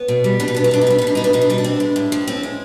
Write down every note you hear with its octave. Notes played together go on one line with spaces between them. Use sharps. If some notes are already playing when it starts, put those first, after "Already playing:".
Already playing: B3 C#4
B2
G3
B2 D4
D#4
B3 D4
D#4
B2 D4
D#4
G3 D4
D#4
B2
D4
B3 D#4
D4
B2 D#4
D4
G3 D#4
D4
C4
G#3
A2
F3
C4 C#4
G#3